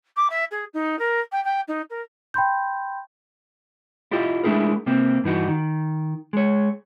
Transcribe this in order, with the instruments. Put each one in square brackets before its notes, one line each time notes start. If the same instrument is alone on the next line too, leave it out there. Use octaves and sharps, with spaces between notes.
[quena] D6
E5
G#4
D#4
A#4
G5
G5
D#4
A#4
[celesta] G5 B5 C6 G6
[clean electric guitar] E4 F4 G4 D#5 E5
G#3 A3 D4 E4 G#4 A#4
C3 A#3 C4
G2 E3 D#4 F#4
D#3
G#3 C#5